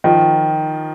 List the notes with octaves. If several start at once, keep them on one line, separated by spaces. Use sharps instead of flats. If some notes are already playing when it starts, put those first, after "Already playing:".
D#3 F3